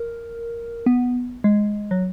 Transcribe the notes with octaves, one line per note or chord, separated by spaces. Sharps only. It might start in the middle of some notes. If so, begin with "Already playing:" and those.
Already playing: A#4
B3
G#3
F#3